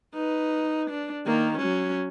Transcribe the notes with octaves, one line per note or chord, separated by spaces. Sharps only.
D#4 B4
D4
D#3 A#3
F#3 C#4